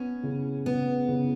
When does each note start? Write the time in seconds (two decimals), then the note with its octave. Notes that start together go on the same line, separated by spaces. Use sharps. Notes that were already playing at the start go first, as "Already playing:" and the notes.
Already playing: B3 C#4
0.23 C#3
0.66 C#3 B3
1.08 C#3